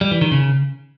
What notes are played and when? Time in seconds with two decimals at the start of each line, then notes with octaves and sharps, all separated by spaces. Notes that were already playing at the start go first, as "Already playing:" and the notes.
0.01 G3
0.11 E3
0.21 D#3
0.32 C#3